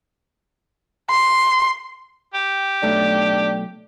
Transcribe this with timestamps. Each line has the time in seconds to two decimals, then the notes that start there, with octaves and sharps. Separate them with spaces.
1.10 C6
2.34 G4
2.83 B1 A3 D4